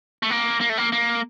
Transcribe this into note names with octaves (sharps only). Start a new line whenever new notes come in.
A3
A#3
A#3
A3
A#3
A#3